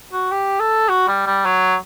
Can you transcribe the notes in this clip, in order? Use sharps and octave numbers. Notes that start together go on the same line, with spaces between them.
F#4
G4
A4
F#4
G3
G3
F#3